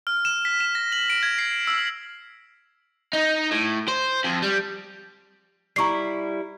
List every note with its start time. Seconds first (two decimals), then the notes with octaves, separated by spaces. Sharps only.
0.07 F6
0.25 E7
0.45 B6
0.60 E7
0.75 A#6
0.92 F#7
1.10 D7
1.23 G#6
1.38 C7
1.67 E6
3.13 D#4
3.51 A2
3.89 C5
4.24 F2
4.42 G3
5.76 G3 E4 A#5 C#6 C7